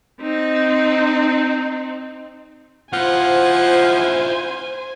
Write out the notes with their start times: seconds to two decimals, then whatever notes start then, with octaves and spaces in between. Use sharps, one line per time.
0.21 C4 D#4
2.93 F3 E4 F4 C5 F#5 G#5